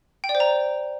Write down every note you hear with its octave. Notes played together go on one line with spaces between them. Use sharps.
G5
D5
C5
A#5